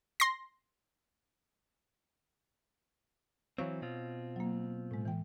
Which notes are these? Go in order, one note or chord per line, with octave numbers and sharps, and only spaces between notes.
C6 A#6
E3 F#3 C4 C#5 F5 C#6
B2 C4 F4
F#3 A#3
A2 G#3
E3 G5